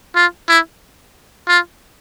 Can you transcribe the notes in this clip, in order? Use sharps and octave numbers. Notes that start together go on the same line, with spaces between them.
F4
E4
F4